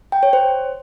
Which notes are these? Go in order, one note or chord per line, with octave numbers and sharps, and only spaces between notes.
G5
C#5
C5